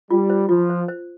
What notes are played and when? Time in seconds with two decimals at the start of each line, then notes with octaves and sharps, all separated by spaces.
0.11 G3 F4
0.30 C5
0.49 F3 F4
0.70 C5
0.88 C5